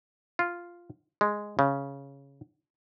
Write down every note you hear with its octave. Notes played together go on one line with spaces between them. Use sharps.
F4
G#3
C#3